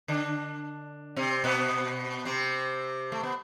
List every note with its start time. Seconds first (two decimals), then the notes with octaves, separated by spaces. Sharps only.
0.08 D3 D4
1.16 C3 C4
1.44 B2 B3
2.25 C3 C4
3.12 A3
3.23 B3